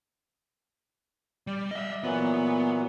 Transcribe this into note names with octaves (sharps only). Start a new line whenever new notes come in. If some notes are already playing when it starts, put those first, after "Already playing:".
G3 D5
D#5 E5
A#2 E3 F#3 B3